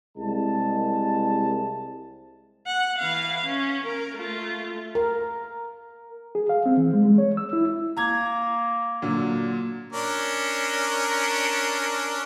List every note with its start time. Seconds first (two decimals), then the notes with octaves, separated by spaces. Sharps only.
0.17 C2 G#3 A5
2.67 F#5
2.98 E3 F5
3.45 C#4
3.85 A#4
4.16 A3 F4
4.95 A#4
6.35 G#4
6.49 F5
6.66 C4
6.77 E3
6.93 G#3
7.06 G#3
7.18 C#5
7.37 E6
7.53 E4
7.97 A#3 A#5 G#6
9.02 A#2 D3 F#3
9.93 C#4 D4 A#4